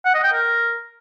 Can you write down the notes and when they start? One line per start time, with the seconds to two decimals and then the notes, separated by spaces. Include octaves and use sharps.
0.05 F#5
0.14 D#5
0.24 G5
0.33 A#4